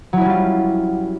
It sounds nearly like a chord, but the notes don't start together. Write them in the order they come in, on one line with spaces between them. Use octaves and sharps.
F#3 E4 C#4 G3 F4